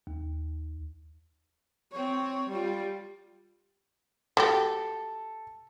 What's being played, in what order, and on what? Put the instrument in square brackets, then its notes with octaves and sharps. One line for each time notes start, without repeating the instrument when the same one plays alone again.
[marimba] D#2
[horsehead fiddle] C4 C#5
G3 F4
[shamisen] G3 F#4 G4 [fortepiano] A4